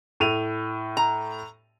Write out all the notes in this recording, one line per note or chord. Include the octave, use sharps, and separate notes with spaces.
A2 D#7 F7
A#5